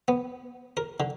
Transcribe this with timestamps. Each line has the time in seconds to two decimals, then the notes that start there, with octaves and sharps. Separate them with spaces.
0.08 B3
0.77 A#4
1.00 D3